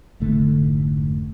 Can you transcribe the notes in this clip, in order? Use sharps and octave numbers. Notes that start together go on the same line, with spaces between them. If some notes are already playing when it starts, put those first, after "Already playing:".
F1 G#2 D3 A3